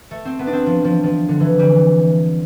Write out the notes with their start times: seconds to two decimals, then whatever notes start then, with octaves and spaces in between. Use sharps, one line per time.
0.11 A3
0.25 C4
0.39 B3
0.47 D4
0.53 C4
0.66 F3
0.84 F3
1.03 F3
1.29 D3
1.40 E3
1.59 G3